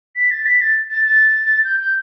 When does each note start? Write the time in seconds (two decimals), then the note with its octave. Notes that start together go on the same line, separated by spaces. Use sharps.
0.16 B6
0.31 A6
0.46 B6
0.61 A6
0.91 A6
1.05 A6
1.64 G6
1.80 G6